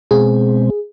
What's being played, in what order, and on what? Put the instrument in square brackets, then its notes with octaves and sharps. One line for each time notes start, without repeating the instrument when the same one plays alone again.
[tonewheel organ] B2 G#3 C4 [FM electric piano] G#4